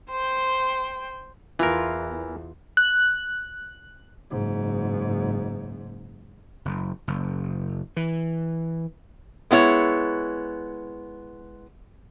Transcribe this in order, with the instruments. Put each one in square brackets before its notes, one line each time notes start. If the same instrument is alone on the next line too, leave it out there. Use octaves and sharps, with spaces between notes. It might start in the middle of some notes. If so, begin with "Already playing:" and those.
[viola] C5 G5
[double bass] E2 [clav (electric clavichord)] E3 A#4 [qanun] F4
[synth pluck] F#6
[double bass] F#1 G#2
[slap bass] F#1
F#1
E3
[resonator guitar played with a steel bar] G#3 B3 E4 C#5